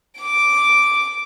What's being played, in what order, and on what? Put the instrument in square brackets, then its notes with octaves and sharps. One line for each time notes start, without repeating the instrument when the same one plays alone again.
[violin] D6 D7